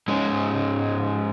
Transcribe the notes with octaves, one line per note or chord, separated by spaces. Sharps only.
G#2 G#3 C#4